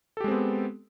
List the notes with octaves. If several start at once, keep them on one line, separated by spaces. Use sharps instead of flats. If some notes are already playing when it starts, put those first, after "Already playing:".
G#3 B3 C4 G4 A4